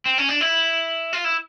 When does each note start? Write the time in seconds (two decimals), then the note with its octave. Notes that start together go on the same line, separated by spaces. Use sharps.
0.06 C4
0.18 C#4
0.29 D4
0.41 E4
1.13 F4
1.24 E4